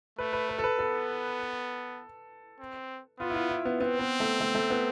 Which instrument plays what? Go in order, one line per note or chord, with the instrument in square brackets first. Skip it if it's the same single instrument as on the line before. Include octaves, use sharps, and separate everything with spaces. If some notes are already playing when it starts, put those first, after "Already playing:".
[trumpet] A3 [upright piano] B4
[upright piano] B4
B4
A4
B4
[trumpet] B3 [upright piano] A4
[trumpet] C4
[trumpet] B3 [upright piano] F4
[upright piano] E4
F4
E4
B3
[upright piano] B3 [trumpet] C4
[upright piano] B3
A3
A3
A3
B3